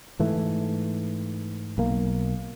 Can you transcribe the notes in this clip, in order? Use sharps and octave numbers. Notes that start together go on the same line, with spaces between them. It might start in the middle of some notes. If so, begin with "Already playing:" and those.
G#2 E3 A3
B1 A#3